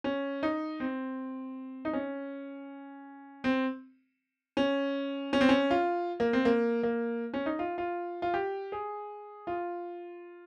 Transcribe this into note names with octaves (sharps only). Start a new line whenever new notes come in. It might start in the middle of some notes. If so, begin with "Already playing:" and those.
C#4
D#4
C4
D#4
C#4
C4
C#4
C#4
C4
C#4
F4
A#3
C4
A#3
A#3
C#4
D#4
F4
F4
F4
G4
G#4
F4